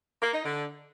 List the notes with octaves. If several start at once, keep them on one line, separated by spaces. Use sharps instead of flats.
A#3
D#4
D3